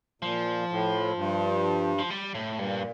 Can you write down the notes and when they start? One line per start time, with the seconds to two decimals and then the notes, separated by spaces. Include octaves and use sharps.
0.22 A#2 F3
0.69 A2
1.16 G2
1.99 F3
2.10 G3
2.35 A2
2.57 G2 A#2